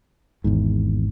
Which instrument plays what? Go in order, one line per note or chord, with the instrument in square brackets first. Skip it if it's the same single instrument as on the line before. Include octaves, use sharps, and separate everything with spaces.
[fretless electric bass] G#1 E2 G#2